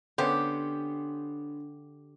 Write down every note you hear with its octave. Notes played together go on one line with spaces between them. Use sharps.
D3 B3 C#4 D4 G4 C5